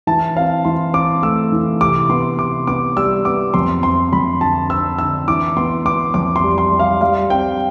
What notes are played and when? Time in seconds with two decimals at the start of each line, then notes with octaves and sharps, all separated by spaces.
0.07 E3 A5
0.36 C4 F5
0.65 E3 C6
0.94 C4 D6
1.23 A3 E6
1.52 E3
1.81 C3 D6
2.09 B3 C6
2.38 C3 D6
2.67 B3 D6
2.96 G3 E6
3.25 B3 D6
3.54 F2 C6
3.83 C4 C6
4.12 F2 B5
4.41 D3 A5
4.70 C4 E6
4.99 D3 E6
5.28 E3 D6
5.56 B3 C6
5.85 B3 D6
6.14 F2 D6
6.36 C6
6.43 G3
6.58 C6
6.72 G3
6.79 F5
7.01 G3 F5
7.30 C4 G5